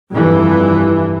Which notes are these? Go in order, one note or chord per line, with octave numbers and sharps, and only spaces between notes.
F1 G2 E3